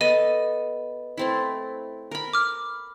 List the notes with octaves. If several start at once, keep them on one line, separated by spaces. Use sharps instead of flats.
B3 A4 D#5 D#7
A3 C4 E4
A#4 B5
D6 F6